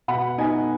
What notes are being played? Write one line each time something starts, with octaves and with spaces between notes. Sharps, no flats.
B2 F#5 B5
B3 D#4 D#5 G#5